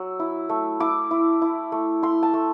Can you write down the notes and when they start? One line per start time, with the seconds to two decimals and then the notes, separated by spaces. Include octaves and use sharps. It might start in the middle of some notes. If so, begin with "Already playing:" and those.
Already playing: F#3 E6
0.19 E4
0.49 A3
0.80 E4 D6
1.11 E4
1.42 E4
1.72 A3
2.03 E4 C6
2.23 A5
2.34 A3